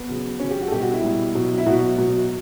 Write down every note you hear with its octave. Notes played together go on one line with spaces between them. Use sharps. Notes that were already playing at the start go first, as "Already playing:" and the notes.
Already playing: B3
C#3 F#3
C#3 F#3 C#4
G4
F#4
A4
B2 G3 G4
F#4
E4
B2 G3
B2 F#3
E4
B2 F#3 F#4
B2 F#3